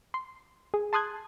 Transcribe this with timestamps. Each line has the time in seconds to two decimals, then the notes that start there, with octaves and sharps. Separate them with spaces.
0.14 C6
0.74 G#4
0.93 A5 C6 D#6 F#6 G#6